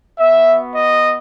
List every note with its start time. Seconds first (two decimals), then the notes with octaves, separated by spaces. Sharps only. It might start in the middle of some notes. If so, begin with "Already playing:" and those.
0.19 B3 F#4 E5
0.75 D#5